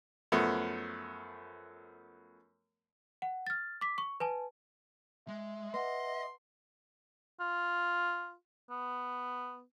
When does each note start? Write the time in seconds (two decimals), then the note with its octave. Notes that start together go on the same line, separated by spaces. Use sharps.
0.32 F#2 F3 A3 B3
3.22 F#5
3.47 F6 A6
3.81 D6 B6
3.98 C#6
4.20 B4 G#5 A5
5.28 G#3 E5
5.74 B4 D#5 F#5 C6
7.40 F4
8.70 B3